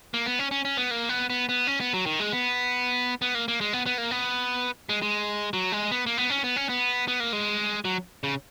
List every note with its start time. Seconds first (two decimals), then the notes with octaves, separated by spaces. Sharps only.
0.14 A#3
0.26 B3
0.39 C#4
0.51 C#4
0.65 C#4
0.77 B3
0.91 A#3
1.09 B3
1.30 B3
1.49 B3
1.67 C#4
1.80 B3
1.94 F#3
2.06 D#3
2.20 G#3
2.32 B3
3.22 B3
3.35 A#3
3.48 A#3
3.61 G#3
3.73 B3
3.86 B3
3.98 A#3
4.11 B3
4.89 G#3
5.02 G#3
5.53 F#3
5.72 G#3
5.91 B3
6.06 A#3
6.17 B3
6.30 C#4
6.44 B3
6.56 C#4
6.69 B3
7.08 B3
7.20 A#3
7.33 G#3
7.85 F#3
8.24 C#3